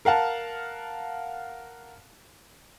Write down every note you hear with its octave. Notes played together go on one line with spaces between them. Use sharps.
A#4 F5 F#5 A5